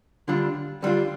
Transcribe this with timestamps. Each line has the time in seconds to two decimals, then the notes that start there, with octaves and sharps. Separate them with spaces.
0.28 D3 G3 D4 F4
0.82 D3 G3 D4 F4